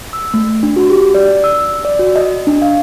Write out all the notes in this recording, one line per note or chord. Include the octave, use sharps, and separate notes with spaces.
E6
A3
D4
F#4
G4
D5
E6
D5
F#4
D#5
D4
F5